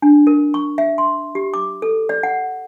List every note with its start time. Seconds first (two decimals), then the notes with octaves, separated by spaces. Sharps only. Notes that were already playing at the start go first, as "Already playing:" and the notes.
0.02 D4
0.27 A#4
0.54 C#6
0.78 E5
0.98 C6
1.35 G4
1.54 D6
1.82 A4
2.09 D5
2.23 F#5